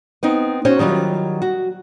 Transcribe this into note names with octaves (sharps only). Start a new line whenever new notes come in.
B3 C4 D#4
C#4 F#4 C5 C#5
D#3 F#3 G3 F4
F#4